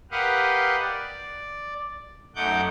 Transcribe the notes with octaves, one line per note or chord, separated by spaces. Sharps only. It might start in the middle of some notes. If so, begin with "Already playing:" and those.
G4 A#4 B4 D#5 F5 F#5
D5
F#2 A3 D#4 F#5 D6 G6